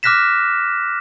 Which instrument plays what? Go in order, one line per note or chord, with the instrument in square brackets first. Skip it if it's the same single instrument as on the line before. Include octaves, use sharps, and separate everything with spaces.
[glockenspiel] D6 F6 F#6 A#6 B6 E7